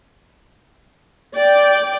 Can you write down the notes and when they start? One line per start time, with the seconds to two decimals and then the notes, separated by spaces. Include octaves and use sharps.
1.34 D5 G5